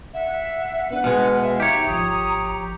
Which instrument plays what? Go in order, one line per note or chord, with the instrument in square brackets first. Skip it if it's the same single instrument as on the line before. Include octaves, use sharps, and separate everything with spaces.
[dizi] E5 [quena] F#5
[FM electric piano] B3 D4 [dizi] B4
[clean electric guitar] B2 G#3 [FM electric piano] F6 C#7
[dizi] E5 [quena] F5
[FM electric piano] D#4 [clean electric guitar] G4 C#5 [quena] A#5
[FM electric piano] G#1 F3 [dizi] D#6